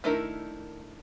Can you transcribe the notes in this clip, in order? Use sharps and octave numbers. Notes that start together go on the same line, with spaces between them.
D#3 A3 D4 E4 A#4